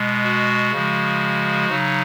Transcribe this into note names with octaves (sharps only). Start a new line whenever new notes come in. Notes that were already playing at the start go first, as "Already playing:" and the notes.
Already playing: B2 G#3
F#4
C#3 F3 G#3
C#3 F#3 D#4